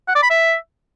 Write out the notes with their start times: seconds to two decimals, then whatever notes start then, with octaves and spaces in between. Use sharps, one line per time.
0.08 F#5
0.15 D5
0.23 B5
0.30 E5